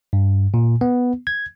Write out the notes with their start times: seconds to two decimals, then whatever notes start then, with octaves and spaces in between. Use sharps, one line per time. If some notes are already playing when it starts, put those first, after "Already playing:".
0.13 G2
0.54 A#2
0.81 B3
1.27 G#6